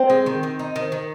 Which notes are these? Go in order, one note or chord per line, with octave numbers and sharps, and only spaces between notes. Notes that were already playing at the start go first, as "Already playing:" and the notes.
Already playing: C4 C5
G#3
D#3
D#3
D#4
D#3
D#3